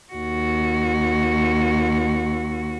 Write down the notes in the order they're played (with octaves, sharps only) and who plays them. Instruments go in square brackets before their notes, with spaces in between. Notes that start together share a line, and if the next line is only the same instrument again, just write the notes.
[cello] D#2 F#4